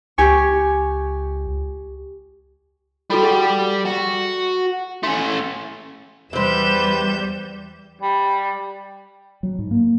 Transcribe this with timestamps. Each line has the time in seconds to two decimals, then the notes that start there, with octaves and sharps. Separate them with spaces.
0.18 C#2 G4 G#5 C#6
3.10 G3 F#4 G4 A4 B5
3.23 G#4 F#5
3.86 F#4
5.03 A3 C#4 C6
6.33 E2 C3 G3 B4 C5 G6 E7
8.01 G3
9.43 F#3
9.59 G#2
9.71 A#3